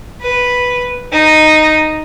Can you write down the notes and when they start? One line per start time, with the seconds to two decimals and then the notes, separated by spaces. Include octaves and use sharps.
0.22 B4
1.12 D#4